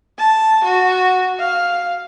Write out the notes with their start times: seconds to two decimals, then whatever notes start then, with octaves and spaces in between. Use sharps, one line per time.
0.18 A5
0.64 F#4
1.40 F5